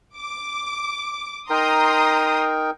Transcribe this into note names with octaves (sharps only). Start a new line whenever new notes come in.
D6
D#4 A#4 G5 A#5 C6 D#6